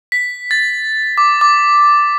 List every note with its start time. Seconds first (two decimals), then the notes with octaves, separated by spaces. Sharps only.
0.12 B6
0.51 A6
1.18 D6
1.41 D6